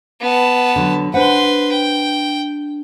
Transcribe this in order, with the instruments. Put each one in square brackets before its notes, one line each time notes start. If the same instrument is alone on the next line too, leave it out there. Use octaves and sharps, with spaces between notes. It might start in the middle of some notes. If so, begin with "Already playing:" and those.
[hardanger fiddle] B3 A5
[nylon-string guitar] D3 F#3
[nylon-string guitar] D4 C5 F#5 [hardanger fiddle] B4 C6
[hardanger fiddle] G5